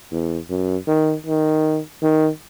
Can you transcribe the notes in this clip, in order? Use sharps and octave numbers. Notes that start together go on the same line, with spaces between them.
E2
F#2
D#3
D#3
D#3